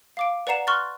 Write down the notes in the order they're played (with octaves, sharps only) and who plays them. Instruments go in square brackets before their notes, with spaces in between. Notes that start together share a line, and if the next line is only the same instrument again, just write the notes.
[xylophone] F5 D6 D7
B4 D5 F#5 A#5 C7 E7
C6 C#6 F6 F#6 A6